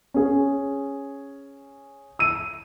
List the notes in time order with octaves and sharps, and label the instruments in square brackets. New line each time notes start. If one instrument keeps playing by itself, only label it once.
[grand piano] C#4 G#4
E6 D#7